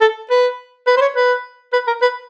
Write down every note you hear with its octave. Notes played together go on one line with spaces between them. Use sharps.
A4
B4
B4
C5
C#5
B4
B4
A#4
B4